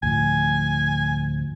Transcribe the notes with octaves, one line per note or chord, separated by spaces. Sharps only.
D2 A2 F3 G#5